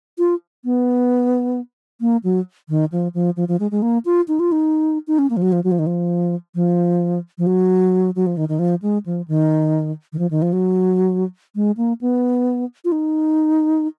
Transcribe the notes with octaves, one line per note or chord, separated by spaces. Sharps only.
F4
B3
A#3
F#3
D#3
F3
F3
F3
F3
G#3
G#3
A#3
F4
D#4
F4
D#4
D#4
C#4
A#3
F3
F#3
F3
F#3
F3
D#3
F3
F3
F3
F#3
F#3
F3
D#3
D#3
F3
G#3
F3
D#3
D#3
F3
D#3
F3
F#3
G#3
A#3
B3
F4
D#4